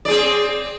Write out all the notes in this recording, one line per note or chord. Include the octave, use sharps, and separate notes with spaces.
C4 G#4 D5